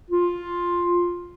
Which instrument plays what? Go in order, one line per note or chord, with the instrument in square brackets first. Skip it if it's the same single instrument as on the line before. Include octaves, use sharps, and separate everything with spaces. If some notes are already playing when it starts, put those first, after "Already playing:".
[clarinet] F4